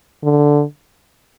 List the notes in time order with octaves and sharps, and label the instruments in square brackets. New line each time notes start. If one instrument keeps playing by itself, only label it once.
[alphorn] D3